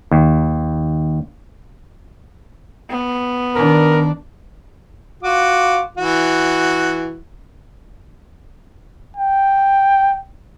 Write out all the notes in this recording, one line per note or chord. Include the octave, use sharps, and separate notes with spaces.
D#2
B3
D#3 D4 A#4
F4 F#4 D6
E3 F#4
G5